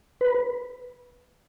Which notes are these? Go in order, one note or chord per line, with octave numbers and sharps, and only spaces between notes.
B4